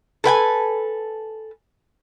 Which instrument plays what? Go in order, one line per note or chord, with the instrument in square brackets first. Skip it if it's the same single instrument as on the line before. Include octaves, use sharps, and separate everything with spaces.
[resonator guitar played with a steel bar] A4 B4 G5 G#5